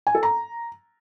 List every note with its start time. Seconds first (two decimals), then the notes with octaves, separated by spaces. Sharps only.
0.07 G#5
0.15 A4
0.23 A#5